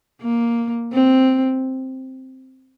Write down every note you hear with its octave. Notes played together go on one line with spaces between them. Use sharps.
A#3
C4